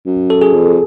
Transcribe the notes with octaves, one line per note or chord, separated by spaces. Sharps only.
F#2
A4
G#4
F2